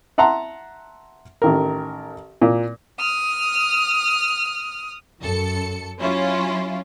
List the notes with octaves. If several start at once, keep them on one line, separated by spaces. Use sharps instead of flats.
E5 F#5 A5 A#5 C6
A1 D#3 A#4
A#2
D#6 F6
F#2 A4 C#7
F#3 C#4 E4 F4